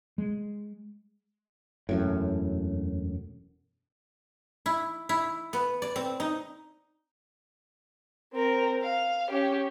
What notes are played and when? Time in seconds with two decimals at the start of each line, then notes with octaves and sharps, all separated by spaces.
0.18 G#3
1.89 E1 F#2 A2
4.66 E4
5.09 E4
5.53 B3
5.82 D5
5.96 C4
6.20 D#4
8.33 C4 A#4
8.82 F5
9.30 C#4 G4